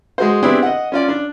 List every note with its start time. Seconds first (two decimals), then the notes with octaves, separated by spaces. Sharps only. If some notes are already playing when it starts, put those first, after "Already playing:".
0.18 G#3 F#4 C5
0.43 B3 C4 D4 E4 G4 G#4
0.63 D#5 F#5
0.92 C#4 F4 D5
1.09 D4